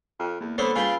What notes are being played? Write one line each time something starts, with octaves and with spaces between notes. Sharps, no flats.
F2
E2 A#3
D3 B3 C#4 C5 B5 E6 A6
C#3 F4 B4 G5 G#5